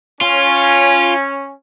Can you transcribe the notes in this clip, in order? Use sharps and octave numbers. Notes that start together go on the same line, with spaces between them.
C#4 F4